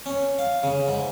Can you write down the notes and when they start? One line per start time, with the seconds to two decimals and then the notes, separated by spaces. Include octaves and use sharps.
0.06 C#4
0.39 F5
0.63 C#3
0.88 G#2